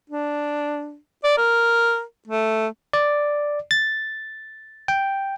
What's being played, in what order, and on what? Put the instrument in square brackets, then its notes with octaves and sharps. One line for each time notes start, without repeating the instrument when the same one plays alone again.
[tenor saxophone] D4
D5
A#4
A3
[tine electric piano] D5
A6
G5